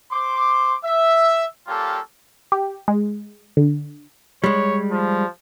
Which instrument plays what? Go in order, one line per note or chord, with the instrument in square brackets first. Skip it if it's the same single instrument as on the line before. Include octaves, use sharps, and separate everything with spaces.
[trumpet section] C5 C6 D6
E5
G3 A#3 C#4 F4 G4 A4
[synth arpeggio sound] G4
G#3
D3
[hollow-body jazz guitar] G3 G#3 [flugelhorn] C#5
[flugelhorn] F3